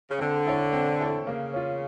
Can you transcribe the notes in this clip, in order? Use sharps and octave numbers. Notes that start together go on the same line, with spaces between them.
C#3
D3 C4
E4 A4 C#5
C4
E4 A4 C#5
C#3 A#3
C#4 F4